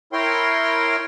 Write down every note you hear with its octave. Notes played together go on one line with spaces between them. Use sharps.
E4 A#4 C#5 G5 C6